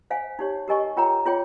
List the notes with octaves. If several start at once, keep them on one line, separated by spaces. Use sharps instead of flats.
C5 F5 G#5
D#4 G4 C#5
G4 A#4 D#5 G#5 C#6
F4 A#4 C#5 G5 A#5
F4 G#4 C#5 G5